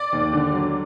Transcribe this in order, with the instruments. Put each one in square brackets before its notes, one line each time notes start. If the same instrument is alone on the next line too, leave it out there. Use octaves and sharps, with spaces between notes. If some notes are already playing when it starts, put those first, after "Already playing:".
Already playing: [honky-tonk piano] D5
[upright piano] D#2
D3
F#3